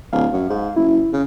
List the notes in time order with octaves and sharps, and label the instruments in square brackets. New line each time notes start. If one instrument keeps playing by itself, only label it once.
[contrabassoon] D1 [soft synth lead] F5
[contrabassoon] F#2
G#2
[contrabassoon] F#1 [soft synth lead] E4
[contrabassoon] C#3